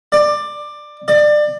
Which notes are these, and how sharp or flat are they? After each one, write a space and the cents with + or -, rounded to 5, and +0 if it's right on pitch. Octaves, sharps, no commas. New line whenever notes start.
D5 +15
D5 +25